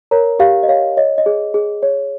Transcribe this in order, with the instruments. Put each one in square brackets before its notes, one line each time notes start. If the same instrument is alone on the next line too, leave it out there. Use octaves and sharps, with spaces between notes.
[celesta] A#4 C#5 A#5
G4 F5
D#5
C#5 F5
C#5 D#5
D#5
G#4
G#4
C#5